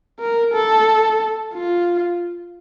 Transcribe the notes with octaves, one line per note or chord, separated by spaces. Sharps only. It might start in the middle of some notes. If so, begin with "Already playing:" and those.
A#4
A4
F4